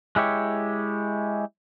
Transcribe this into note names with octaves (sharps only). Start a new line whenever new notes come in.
G#3 E4 G4 C#5